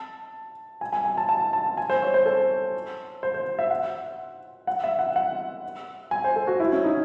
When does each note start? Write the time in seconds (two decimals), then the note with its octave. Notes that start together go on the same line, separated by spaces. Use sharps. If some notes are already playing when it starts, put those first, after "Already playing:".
Already playing: A5
0.81 G#5
0.93 G#5
1.05 G#5
1.18 A5
1.29 A5
1.53 A5
1.77 G#5
1.90 C5
2.02 C#5
2.14 C5
2.26 A4
3.23 C5
3.34 C5
3.59 E5
3.70 F#5
4.67 F#5
4.84 E5
4.99 F#5
5.16 F#5
6.11 G#5
6.24 C5
6.36 A4
6.47 F#4
6.60 E4
6.73 C#4
6.84 D#4